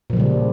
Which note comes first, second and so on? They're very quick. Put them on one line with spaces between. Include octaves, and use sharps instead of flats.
A#2 F3 C#3 G3